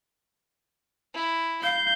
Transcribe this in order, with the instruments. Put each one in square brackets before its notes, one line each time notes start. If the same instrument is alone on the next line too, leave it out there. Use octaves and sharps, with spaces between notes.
[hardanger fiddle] E4
[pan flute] F5 [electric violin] G6